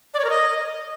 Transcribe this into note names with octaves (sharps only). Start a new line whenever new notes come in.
D5
C#5
A#4
D#5